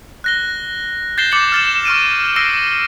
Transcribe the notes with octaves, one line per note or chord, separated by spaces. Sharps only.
F#6 A#6 G7
G6 A6 A#6 C7 E7 G7
D6 G6 A6 C#7 F#7
F6 A6 E7
C#6 F6 D7 D#7
E6 A#6 C7 D7 G7